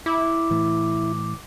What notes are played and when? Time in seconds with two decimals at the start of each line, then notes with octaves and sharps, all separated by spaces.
0.06 E4 D6
0.51 A2 E3